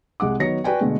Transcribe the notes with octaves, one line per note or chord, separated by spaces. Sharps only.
C2 G#3 F#5 D6
D#3 F#3 B3 C#5 A#6 C#7
F#4 B4 D5 G5 G#5
B2 D3 G#3 A3